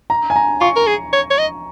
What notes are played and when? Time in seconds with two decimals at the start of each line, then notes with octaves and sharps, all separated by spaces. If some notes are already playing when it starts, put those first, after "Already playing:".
0.10 A#5
0.30 G#5
0.36 A#5
0.61 F4 C#6
0.76 A#4
0.87 G#4
1.13 C#5
1.30 C#5
1.38 D#5